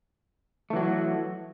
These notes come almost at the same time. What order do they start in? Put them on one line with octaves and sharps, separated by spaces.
A3 E3 F#3